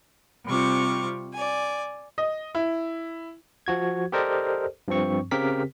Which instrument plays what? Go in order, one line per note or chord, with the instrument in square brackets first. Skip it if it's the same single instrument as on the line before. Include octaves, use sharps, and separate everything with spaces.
[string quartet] C3 G3 C4 F4 C#6 D6
D5 G#5
[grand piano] D#5
E4
[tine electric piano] F3 F#4 G#6
G4 A4 A#4 C5 D5 D#5
G2 F3 C4 C#6
C#3 C4 G4 A#4 B6